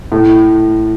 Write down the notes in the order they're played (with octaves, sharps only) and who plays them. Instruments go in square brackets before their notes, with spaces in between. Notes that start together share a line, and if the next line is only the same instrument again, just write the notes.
[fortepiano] A2